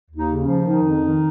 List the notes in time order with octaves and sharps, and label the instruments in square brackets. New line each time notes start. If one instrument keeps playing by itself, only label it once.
[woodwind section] D#2
D#4
C#3
C#4
F3
D#3 D#4
F2
D#3